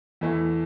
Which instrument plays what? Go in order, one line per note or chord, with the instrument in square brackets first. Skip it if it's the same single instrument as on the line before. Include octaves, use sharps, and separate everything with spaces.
[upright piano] E2 E3 A3 E4